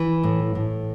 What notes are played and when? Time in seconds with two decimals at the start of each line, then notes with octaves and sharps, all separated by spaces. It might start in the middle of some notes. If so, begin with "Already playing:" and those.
Already playing: E3
0.23 A2
0.55 A2